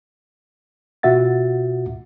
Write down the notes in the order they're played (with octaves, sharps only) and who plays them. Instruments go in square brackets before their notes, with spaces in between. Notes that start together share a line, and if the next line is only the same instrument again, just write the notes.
[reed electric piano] B2 F4 F#4 E5 F#5 A6